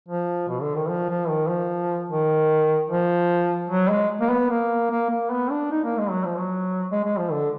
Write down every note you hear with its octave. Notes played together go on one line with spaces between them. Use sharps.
F3
B2
D3
D#3
F3
F3
D#3
F3
D#3
F3
F#3
G#3
A#3
B3
A#3
A#3
A#3
B3
D4
D#4
A#3
G#3
F#3
F3
F#3
G#3
G#3
F3
D3